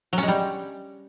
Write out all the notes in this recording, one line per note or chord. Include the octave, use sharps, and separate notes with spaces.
F#3
C#4
G#3
G3